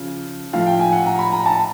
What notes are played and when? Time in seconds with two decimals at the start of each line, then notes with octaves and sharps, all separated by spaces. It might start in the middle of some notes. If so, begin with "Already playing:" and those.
Already playing: C#3 F3
0.53 A2 F3 F5
0.67 G5
0.79 G#5
0.92 F#5
1.06 A#5
1.19 B5
1.32 A#5
1.46 A5